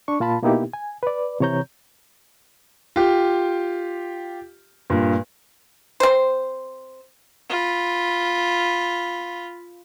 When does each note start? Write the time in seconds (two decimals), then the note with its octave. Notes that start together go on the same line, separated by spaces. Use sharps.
0.08 D4 C#6
0.20 A#2 F4 A5 B5
0.42 B2 A#3 B3 D#4 E4 G4
0.73 G#5
1.03 B4 D5
1.40 C3 E3 C#5 A#5 G6
2.96 F4 G4
4.90 G2 A#2
6.00 C4 C5
7.50 F4 B5